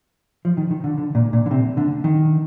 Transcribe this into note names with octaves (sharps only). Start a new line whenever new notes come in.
F3
D#3
D#3
D3
D3
A#2
A#2
D3
C3
D3
D#3